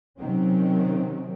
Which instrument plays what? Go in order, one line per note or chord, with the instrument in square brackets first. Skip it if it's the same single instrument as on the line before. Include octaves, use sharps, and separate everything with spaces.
[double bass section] C3 D#3 F#3 C4 C#4